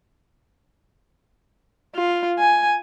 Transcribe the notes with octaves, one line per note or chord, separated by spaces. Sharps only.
F4
G#5